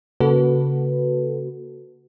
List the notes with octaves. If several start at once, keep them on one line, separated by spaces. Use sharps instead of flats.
C#3 A#3 F#4 A4 B4